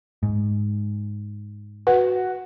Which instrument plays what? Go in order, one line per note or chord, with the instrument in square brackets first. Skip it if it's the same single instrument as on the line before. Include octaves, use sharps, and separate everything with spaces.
[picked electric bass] G#2
[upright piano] F#4 [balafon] B4